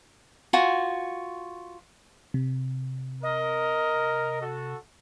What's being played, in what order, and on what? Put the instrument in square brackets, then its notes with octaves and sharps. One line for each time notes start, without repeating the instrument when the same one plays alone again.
[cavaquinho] F4 F#4 G#5
[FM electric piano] C3
[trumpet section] A#4 [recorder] D#5
[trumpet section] F#4 A4